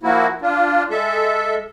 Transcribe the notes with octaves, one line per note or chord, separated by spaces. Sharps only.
F3 A#3 E4 F#4
D4 F4
G#3 A4 E5